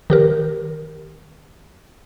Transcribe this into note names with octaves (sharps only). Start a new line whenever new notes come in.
D#3 G4 A#4